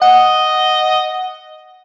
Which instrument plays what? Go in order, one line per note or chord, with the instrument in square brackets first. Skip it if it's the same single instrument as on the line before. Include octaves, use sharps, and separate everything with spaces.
[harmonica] D#5 [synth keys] F#5